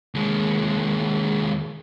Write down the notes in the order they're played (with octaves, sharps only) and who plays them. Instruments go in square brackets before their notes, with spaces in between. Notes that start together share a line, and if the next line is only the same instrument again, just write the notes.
[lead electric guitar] D#2 G#3